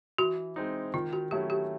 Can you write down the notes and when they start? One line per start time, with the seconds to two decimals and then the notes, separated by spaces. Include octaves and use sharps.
0.18 E3 F#4
0.56 G#3 C4 D#4
0.94 D#3 F4
1.13 F#4
1.31 F#3 A3 C#4 E4 G4
1.50 G4